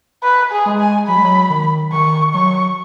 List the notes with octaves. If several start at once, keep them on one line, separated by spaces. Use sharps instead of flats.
B4
G#4
G#3
G#5
F#3 B5
G#3
F#3
D#3
D#3 C#6
F#3 C#6